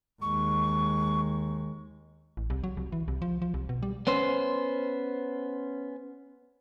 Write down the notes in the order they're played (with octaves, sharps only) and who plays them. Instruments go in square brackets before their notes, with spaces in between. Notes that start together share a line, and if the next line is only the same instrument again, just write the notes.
[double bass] D#2 G#3 [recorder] C#6
[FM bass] A1
C2
F#3
C2
E3
C2
F3
F3
C2
B2
G3
[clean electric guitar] B3 C#4 C5